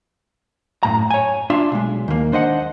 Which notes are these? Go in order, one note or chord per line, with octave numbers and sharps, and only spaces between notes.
F#2 A2 A#5
C#5 G#5
D4 F4 E5 C6
B1 G#3
D#2 A#3
D4 C5 D#5 F#5